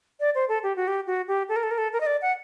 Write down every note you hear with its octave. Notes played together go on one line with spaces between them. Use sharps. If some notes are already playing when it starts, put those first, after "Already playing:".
D5
C5
A4
G4
F#4
G4
F#4
G4
A4
A#4
A4
A#4
A4
A#4
D#5
D5
F#5